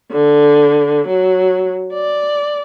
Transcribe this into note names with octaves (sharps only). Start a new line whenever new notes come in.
D3
F#3
D5